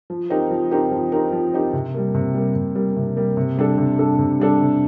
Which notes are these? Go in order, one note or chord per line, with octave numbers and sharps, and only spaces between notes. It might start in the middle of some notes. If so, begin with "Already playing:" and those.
F3
C4 D#4 G4 A#4
F3
C4 D#4 G4 A#4
F3
C4 D#4 G4 A#4
F3
C4 D#4 G4 A#4
C3
G3 A#3
C3
G3 A#3
C3
G3 A#3
C3
G3 A#3
C3
G3 D4 A4
C3
G3 D4 A4
C3
G3 D4 A4
C3